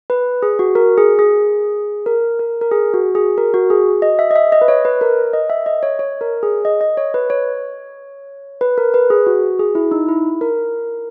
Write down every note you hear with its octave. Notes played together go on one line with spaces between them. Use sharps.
B4
G#4
F#4
A#4
G#4
G#4
A#4
A#4
A#4
G#4
F#4
G#4
A#4
F#4
G#4
D#5
E5
D#5
E5
D#5
B4
C#5
B4
A#4
D#5
E5
D#5
C#5
C#5
A#4
G#4
D#5
D#5
C#5
B4
C#5
B4
A#4
B4
G#4
F#4
G#4
E4
D#4
E4
A#4